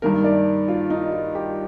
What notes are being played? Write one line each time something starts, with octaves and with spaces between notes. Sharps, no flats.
G2 D#3 A#3 A#4
D5
F4
D#4
F4
G4